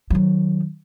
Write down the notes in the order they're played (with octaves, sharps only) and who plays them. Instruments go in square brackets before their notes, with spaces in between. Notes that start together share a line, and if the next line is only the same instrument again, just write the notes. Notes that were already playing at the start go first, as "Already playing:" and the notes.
[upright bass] D#3 F#3